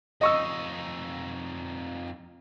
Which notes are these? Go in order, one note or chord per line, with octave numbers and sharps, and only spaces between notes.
F2 D#4 D#5 C#6 E6